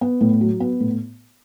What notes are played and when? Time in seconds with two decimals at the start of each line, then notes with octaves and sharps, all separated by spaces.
0.01 B3
0.21 A2
0.41 F#3
0.60 B3
0.80 A2